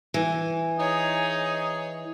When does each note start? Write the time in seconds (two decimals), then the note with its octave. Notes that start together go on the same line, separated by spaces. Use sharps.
0.14 E3
0.79 D#4 G#4 C#5